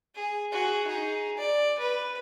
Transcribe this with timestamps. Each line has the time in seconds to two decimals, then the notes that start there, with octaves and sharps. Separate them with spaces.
0.15 G#4
0.52 F#4 G#4
0.87 D#4 G#4
1.38 D5
1.79 B4